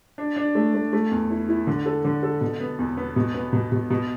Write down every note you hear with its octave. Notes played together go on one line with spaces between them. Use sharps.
D4
D4
A3
A3
A3
E2
E4
E4
D3
A4
D3
A4
B2
B3
E2
B3
B2
B3
B2
B2
B2